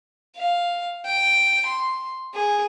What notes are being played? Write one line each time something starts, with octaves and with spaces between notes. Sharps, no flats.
F5
G5
C6
G#4